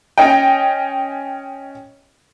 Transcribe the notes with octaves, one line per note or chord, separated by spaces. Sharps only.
C#4 D#5 G5